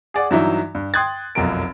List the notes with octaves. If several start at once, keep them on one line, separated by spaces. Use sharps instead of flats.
G#4 D5 F#5
G2 E3 F#3 D#4 E4
G2
G5 C6 D#6 F#6 G#6 A6
F1 B1 F#2 F3 A#4 D7